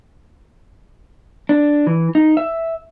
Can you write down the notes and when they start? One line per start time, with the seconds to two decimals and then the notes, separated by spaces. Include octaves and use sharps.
1.49 D4
1.87 E3
2.15 D#4
2.37 E5